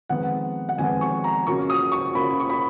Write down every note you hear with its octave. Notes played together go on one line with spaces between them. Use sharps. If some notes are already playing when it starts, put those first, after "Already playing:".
F2 D#3 G#3 B3 F#5
F#5
F2 D#3 G#3 B3 G#5
C#6
A#5
C#3 F#3 A#3 F4 C#6
D#6
C#6
C#3 F#3 A#3 F4 B5
C#6
B5